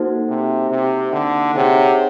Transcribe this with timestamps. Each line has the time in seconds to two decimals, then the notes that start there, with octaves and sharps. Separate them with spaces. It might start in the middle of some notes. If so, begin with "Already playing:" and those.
Already playing: A#3 D#4 F#4 A4 C5
0.29 C3
0.71 C3
1.13 D3
1.55 C3 D#4 G#4 C#5 F#5